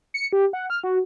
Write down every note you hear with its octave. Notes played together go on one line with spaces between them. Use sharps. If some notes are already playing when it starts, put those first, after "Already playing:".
C#7
G4
F#5
F6
F#4